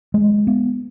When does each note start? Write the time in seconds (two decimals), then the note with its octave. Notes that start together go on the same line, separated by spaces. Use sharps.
0.14 G#3
0.47 B3